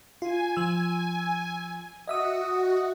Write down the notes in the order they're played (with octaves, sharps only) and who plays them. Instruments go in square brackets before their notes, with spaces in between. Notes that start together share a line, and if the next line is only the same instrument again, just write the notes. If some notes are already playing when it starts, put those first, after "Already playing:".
[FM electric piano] F4 [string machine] G#5
[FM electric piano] F3 E6
[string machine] F#4 [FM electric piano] D#5 E5 D#6